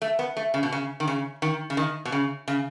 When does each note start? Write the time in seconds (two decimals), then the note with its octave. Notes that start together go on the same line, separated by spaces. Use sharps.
0.02 A3
0.19 B3
0.37 A3
0.54 C#3
0.63 B2
0.72 C#3
1.00 D#3
1.07 C#3
1.42 D#3
1.70 C#3
1.77 D#3
2.05 B2
2.12 C#3
2.48 C#3